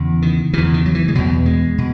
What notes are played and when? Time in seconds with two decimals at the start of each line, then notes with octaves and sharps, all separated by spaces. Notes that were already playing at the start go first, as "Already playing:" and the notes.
Already playing: E2 C#3
0.22 D#3
0.53 E2 C#3 E3
0.74 D#3
0.85 F#3
0.95 E3
1.08 G#3
1.15 E2 B2 F#3
1.46 G#3
1.78 B2